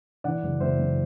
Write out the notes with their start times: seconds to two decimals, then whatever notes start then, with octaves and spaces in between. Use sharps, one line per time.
0.24 E3 D5 F#5
0.43 F#1
0.60 F#1 C5 E5
0.79 F#2